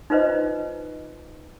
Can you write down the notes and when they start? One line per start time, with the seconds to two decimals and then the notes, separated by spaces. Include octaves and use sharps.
0.10 D#4 F4 B4 C5 D#5